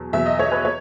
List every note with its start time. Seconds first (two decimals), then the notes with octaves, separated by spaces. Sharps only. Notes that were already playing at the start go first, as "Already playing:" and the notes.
Already playing: E2 B2 F#3
0.13 E2 B2 F#3 E5
0.26 D#5
0.39 C#5
0.52 B4
0.65 C#5